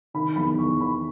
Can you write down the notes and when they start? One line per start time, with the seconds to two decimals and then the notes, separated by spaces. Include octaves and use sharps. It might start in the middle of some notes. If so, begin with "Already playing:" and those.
0.14 D#3 B5
0.36 E2 B5
0.58 E2 C#6
0.80 D#3 B5